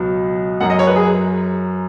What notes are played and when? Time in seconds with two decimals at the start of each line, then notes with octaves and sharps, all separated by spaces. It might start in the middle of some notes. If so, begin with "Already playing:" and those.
Already playing: C#2 B2 F#3
0.60 F#2 F#3 F#5
0.70 D#5
0.79 C#5
0.87 B4
0.96 G#4